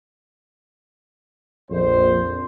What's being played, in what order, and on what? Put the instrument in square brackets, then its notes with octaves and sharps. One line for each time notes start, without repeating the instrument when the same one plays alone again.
[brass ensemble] A#1 F2 C5